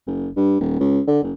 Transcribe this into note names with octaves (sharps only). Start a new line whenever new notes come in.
F#1
G2
D#1
C#2
D3
F#1